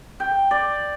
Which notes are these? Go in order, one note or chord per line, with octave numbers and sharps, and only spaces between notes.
G5
D5